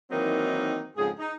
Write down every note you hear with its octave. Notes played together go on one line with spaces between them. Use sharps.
D#3 E3 F#3 A#3 C4 D#4
F2 G#2 C#3 G#4
D#4